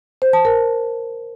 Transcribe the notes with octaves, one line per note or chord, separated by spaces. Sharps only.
C5
A5
A#4